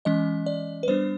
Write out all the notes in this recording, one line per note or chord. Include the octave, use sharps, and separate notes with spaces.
E3 G#3 C#4 D#5
D5
B4
G3 B3 D4 C5